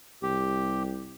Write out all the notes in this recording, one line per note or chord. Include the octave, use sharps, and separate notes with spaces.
C2 G4